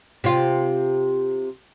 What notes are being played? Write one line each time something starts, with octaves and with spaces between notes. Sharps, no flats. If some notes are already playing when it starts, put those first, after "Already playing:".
C3 F4